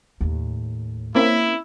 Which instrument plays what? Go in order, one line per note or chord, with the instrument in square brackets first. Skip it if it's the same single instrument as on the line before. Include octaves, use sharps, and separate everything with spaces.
[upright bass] D#2 A2
[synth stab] A#3 C4 C#4 [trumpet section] E4